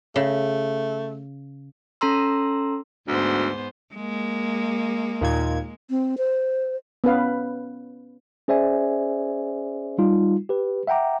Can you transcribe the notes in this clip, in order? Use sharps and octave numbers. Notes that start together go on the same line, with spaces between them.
C#3 A3
C#4 A4 A#5 C6 E6
D2 G#2 B3 C5
G#3 A#3
D#2 A#2 G#6
C4
C5
B3 C#4 B4 F5
C#4 G#4 C5 D5 E5 G#5
G3 D#4 F4
G4 B4
E5 F#5 G5 A#5 D6